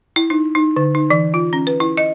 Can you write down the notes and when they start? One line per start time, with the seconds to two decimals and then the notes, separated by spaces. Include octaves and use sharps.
0.16 E4
0.30 D#4
0.55 D#4
0.76 D3
0.95 D#4
1.10 E3
1.34 F4
1.53 C#4
1.67 B4
1.80 E4
1.97 D#5